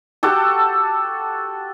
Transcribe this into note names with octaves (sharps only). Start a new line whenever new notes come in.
F#4 G4 A4